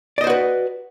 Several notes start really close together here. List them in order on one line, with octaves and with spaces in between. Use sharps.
D5 D#5 C5 F#4 B4